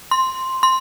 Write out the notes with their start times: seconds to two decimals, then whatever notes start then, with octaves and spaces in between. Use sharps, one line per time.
0.11 C6
0.63 C6